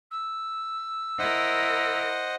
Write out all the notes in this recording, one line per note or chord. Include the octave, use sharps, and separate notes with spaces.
E6
E4 A#4 C5 D#5 F#5